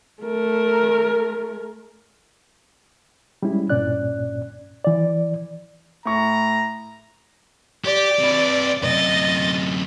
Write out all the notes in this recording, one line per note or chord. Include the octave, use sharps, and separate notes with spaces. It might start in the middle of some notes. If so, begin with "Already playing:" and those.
A3 A#4
G3 G#3 C#4 E4
C2 G2 A#2 C#4 D5 F#6
E3 D5
A2 A#5 C#6
G4 D5
C3 B4
F#2 C3 D#5 A6